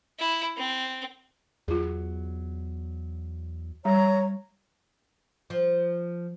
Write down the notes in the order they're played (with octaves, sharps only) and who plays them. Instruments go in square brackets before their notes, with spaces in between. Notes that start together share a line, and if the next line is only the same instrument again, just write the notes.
[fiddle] E4
C4
[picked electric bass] E2 F#3 [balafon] F4 G#4
[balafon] G3 [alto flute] C#5 [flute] A#5
[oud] F3